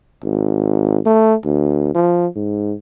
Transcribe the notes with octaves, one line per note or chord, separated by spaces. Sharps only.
G#1
A3
D2
F3
G#2